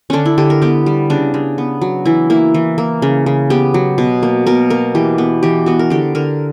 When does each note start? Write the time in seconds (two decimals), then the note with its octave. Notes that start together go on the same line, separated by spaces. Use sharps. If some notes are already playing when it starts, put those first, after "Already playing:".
0.10 D3 C#4 D4
0.26 E4
0.38 D3 G4
0.50 A#4
0.62 B3 G4
0.86 G3
1.10 C#3 D4
1.34 C#3
1.58 B3
1.82 F#3
2.05 E3 E4
2.30 A#3 E4
2.54 E3
2.78 A#3
3.02 C#3
3.26 C#3
3.50 B3 G4
3.74 F#3
3.98 B2
4.23 A#3
4.46 B2 A#4
4.70 A#3 A#4
4.95 E3 G4
5.18 B3
5.43 E3 G4
5.66 B3 F#4
5.79 A#4
5.90 D3 G4
6.15 D3 A#4